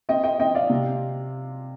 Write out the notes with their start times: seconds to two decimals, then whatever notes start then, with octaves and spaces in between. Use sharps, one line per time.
0.09 C4 D#5 G5
0.24 D#5 G5
0.40 C4 D#5 G5
0.55 D5 F5
0.70 C3